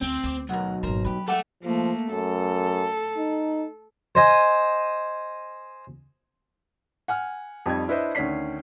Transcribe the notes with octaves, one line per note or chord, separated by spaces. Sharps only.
D2 C4
D2 C5 D6
B1 A#4 F#5
G#1 A#2 A#4 C5 A#5
F#3 G3 G4 B4
A3 G4 A4 F#5 D6
F3 A3 A#3
F#2 A4
D#4
C5 D#5 G#5
F#5 G#5 F6
F2 G3 D#4 G#6
D4 E4 B4 C5 D#5 E5
D2 D#3 C#4 D5 B6 C7